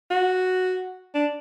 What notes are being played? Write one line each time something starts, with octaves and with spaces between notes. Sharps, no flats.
F#4
D4